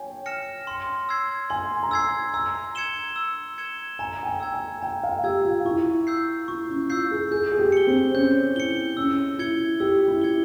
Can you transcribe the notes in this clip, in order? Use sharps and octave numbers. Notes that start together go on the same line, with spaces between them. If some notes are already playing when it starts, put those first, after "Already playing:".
Already playing: C#5 G5 G#5
F6 A#6 C#7 E7
C6
E6 G#6 C7
G#5 C6
A#5
G#5 E6 G#6 C7
A#5 E6
G#6 C#7 E7 G7
E6
G#6 C#7 E7 G7
G#5 A#5
G5
G#5
E6 G#6
G#5
G5 A#5
F5
G4 E6 G#6
F4
E4 C#6
E6 G6 C7
E4 C#6
C#4
F4 E6 G6 C7
G#4
G#4 G6
G#4
G4
C#7 G7
C4
C#4 G6
E4 C#7 G7
C#4 E6
E4 G#6 C#7 G7
G4 E6
E4
G#6 C#7 G7